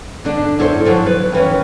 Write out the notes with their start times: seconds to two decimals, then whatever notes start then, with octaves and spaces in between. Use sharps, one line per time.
0.25 D3 D4
0.59 F#2 E4 A4 C5
0.85 D3 F3 F#3
1.06 B4
1.32 D#2 E3 C#4